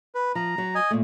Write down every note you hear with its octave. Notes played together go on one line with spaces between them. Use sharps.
B4
F3 A#5
F#3
D#5 G#5
A#2 A3